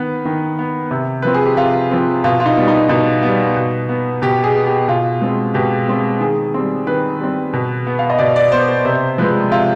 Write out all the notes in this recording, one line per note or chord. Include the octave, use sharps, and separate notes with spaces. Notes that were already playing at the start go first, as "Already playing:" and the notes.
Already playing: D#3 B3 B4
D#3
B3
C3
F3 C4 B4
G#4
G4
C3 F4
F3 C4
B2 F4
F4
D#4
G3 B3
D#4
B2 D#4
G3 B3
B2
B3
B2 G4
G#4
B3
G4
B2 F4
G#3 C4
B2 G4
G#3 C4
D#3 G#4
G3 C4
D#3 B4
G3 C4
B2
B3
F5
D#5
B2 D5
D5
B3 C5
C5
C3 C5
F3 G#3 B4
C3 F4